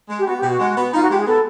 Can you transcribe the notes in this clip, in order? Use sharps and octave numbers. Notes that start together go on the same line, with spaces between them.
G#3
G4
B3 F#4
G4
B2
F#4
G#3
B3
D#4 F4
F#4
G#3 G4
G#4
B3 A4